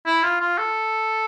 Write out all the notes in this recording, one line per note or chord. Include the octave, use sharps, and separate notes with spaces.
E4
F4
F4
A4